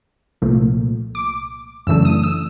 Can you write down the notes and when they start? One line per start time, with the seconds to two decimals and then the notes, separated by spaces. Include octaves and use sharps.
0.42 C2 A#2 F3 A3
1.15 D6
1.87 F#2 C#3 E3 A3 D4 E6
2.05 D#6
2.23 E6